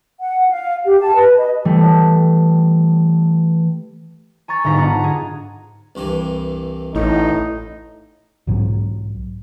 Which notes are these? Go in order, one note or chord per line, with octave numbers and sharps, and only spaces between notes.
F#5
F5
G4
A5
B4
D#5
E3 G3 A3
G#5 A#5 C#6 A6
G1 G#2 D#4 A#5 B6
B3 D4 D#4 F4 F#5 A#5
G#4 A#5
C2 G2 E3
A1 A2 D#4
B1 G#2 F#3